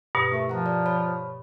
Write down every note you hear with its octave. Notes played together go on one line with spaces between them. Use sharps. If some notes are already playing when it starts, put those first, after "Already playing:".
G2 B2
A3 E4 A#4
F3 F#5 A#5
D5
C#5 B5